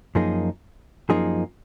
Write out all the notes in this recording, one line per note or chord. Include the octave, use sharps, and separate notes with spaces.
F#2 F3 A#3 D#4 G#4
F#2 F3 A#3 D#4 G#4